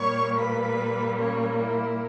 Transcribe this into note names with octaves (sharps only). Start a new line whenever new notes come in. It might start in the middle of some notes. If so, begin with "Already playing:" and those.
Already playing: A#2 G3 A#3 C#5 C#6
B4 B5
C#4 C#5
E4